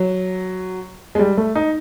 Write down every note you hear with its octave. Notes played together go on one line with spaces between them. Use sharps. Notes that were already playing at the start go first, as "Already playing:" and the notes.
Already playing: F#3
G#3
G3
A3
D#4